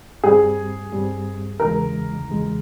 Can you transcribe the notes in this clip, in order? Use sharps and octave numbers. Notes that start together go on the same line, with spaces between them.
G2 G3 C4 G#4
G2 G3 C4
E2 C#3 E3 G#3 A#4
E2 C#3 E3 G#3